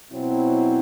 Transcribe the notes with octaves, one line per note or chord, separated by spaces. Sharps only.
B2 F#3 C4 E4